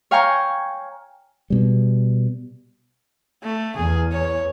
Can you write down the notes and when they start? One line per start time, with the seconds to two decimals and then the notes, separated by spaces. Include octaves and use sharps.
0.11 C#5 F5 G5 G#5 A#5 C#6
1.50 B2 G3
3.43 A3
3.76 E2 G#4
4.12 C#5